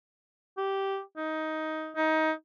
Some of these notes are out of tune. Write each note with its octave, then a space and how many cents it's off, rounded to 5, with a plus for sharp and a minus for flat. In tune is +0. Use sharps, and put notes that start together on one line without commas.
G4 -10
D#4 +15
D#4 +20